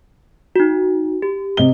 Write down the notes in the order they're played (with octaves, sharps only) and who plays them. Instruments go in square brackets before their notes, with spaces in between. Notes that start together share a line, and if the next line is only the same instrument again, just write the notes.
[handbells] D#4 F#4
G4
[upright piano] C3 D#5 G7